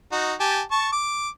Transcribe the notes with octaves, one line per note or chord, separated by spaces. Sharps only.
D#4 F#4
G4 G#5 A5
A5 C#6
D6